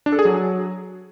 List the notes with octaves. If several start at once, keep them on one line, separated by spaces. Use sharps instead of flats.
D4
A4
G#4
F#3